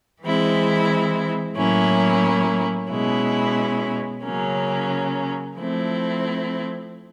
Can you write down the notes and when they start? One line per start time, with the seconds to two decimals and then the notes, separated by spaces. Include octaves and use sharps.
0.22 E3 G#3 C4 E4
1.56 A2 F#3 A#3 C#4 E4
2.89 B2 G#3 C#4 E4
4.24 C#3 F#3 A#3 C#4
5.57 F3 A3 C4 E4